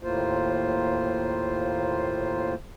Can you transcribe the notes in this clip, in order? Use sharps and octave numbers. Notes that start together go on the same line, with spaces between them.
D#2 A2 A#3 F4 C5